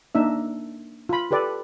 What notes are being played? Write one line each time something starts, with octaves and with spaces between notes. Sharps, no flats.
A#3 D4 D#4 E5
F4 B5
G4 A4 B4 D5